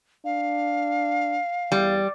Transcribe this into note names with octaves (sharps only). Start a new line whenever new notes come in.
D4 F5
E2 G3